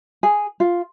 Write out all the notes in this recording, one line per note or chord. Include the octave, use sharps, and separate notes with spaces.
G#4
F4